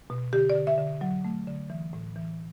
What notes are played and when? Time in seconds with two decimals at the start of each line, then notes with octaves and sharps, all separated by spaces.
0.10 B2
0.33 D3 G4
0.50 D5
0.56 D3
0.67 E5
0.78 D3
1.01 F#3
1.25 A3
1.47 D3
1.70 E3
1.93 A2
2.16 E3